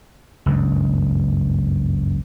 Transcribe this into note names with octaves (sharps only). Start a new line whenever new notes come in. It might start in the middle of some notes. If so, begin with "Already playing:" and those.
F#1 C#2 G2